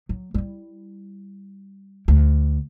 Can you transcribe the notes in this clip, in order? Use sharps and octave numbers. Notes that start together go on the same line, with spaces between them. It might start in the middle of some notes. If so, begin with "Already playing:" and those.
F#3
G3 E4
D2